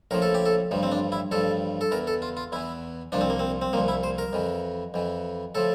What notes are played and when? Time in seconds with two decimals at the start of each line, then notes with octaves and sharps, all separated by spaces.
0.11 A#1 A2 F3 A#4
0.22 A4
0.34 G4
0.46 A4
0.71 A1 G2 F3
0.83 C4
0.92 D4
1.12 E4
1.31 A1 G2 F3 A4
1.81 A4
1.91 E2 E3 A#4
2.07 A4
2.22 F4
2.37 F4
2.52 E2 E3 E4
3.12 C2 A#2 F3 D4
3.21 C4
3.30 A#3
3.39 C4
3.62 C4
3.73 C2 A#2 F3 A#3
3.88 E4
4.03 C5
4.18 A#4
4.33 F2 E3
4.94 F2 E3
5.55 A2 F3 A4